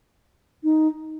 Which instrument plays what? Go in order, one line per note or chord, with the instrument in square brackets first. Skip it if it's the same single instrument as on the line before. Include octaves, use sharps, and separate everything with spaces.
[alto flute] D#4